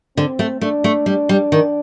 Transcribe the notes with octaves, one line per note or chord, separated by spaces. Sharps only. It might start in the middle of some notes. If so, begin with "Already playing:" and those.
D3 C4
A3
A3 D4
A3
G3
G3
D#3